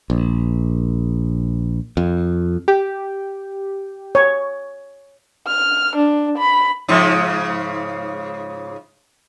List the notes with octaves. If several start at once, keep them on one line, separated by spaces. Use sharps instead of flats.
A#1
F2
G4
C#5
F6
D4
B5
G#2 C#3 F3